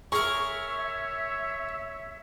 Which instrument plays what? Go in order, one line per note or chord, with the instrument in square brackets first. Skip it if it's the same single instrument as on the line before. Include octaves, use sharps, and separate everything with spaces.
[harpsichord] G#4 A#4 [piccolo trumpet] C#5 [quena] E5 [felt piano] C#6